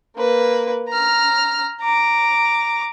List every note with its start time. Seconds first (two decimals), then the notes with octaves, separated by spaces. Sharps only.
0.16 A#3 B4
0.89 A#5 F6
1.81 A#5 D6